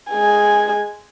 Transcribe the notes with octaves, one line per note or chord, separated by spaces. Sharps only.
G#3 G#5